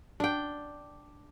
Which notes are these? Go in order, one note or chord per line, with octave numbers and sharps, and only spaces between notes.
D4 G5